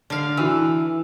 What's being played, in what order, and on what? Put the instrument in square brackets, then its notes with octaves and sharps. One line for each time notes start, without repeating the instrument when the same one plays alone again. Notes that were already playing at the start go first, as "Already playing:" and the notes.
[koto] D3 F5
[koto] E3 [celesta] E4 F#4 E6